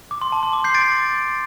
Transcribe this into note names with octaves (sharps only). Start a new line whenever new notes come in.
D6
C6
A5
C6
D6
G6 C7
A6 D7